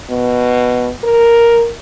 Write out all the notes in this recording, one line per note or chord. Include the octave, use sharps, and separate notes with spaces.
B2
A#4